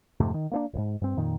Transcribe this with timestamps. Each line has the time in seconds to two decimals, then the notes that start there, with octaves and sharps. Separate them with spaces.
0.20 F2 G#2 C3 A3
0.34 D#3
0.52 A#3 C4 D4
0.74 D#1 G#2
1.02 G2 C4
1.17 F2 A#2 D#3